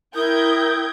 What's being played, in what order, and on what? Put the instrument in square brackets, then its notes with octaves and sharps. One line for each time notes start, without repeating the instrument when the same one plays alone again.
[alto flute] E4 [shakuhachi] A#4 [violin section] G5 G6 G#6 [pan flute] D#6